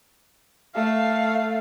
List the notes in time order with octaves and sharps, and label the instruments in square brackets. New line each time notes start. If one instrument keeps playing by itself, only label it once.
[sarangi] A3 [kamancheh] F5